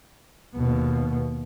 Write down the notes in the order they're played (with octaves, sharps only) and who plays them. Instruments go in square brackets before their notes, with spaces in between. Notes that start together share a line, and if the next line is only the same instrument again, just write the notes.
[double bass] D#2 B2